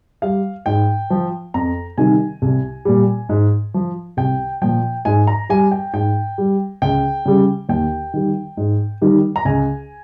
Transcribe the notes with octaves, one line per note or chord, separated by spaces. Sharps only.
G3 F5
G#2 G5
F3
F2 A#5
C3 D#3 G3 G#5
C2
A#2 G3
G#2
F3
C2 G5
A#2 F3 G5
G#2 G#5
A#5
G3 G#5
G5
G#2 G5
G3
C#2 G5
C#3 G3
D#2 G5
D#3 G3
G#2
D#3 G3
A#5
C#2 G#5